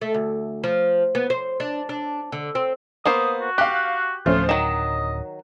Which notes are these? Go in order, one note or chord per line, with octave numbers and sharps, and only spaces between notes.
A3
D2
F3
B3
C5
D4
D4
D3
C4
A#3 B3 C5 D#6
F#4
G4 F5 F#6
D1 F3 A3 C#4 F4
D#3 F#3 D#5 E7